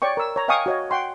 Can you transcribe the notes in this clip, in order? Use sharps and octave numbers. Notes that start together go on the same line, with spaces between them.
C#5 D5 G5 C#6
A#4 E6
C#5 A#5
D#5 F5 G5 G#5 C#6 D#6
F#4 C#5 D#5
F#5 G5 C6 C#6